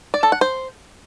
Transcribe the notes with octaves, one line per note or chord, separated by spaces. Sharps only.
D5
A4
F#5
C5